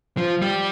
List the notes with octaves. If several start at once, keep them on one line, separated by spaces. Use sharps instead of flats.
F3
G3